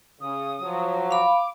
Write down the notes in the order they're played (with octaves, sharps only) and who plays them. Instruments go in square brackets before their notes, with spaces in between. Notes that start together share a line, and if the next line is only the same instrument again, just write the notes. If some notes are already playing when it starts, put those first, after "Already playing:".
[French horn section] C#3 [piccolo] D#6
[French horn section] F3 F#3
[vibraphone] F5 B5 [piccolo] D6